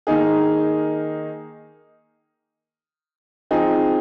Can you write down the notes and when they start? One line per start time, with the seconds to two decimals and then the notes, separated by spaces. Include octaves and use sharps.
0.07 D#3 A#3 D#4 G#4
3.51 F3 C4 D#4 G#4